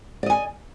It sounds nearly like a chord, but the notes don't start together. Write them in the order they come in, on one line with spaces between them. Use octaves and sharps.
D5 D#5 G#5